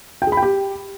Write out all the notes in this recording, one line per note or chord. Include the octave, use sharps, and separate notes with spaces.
G5
G#4
B5
G5
G4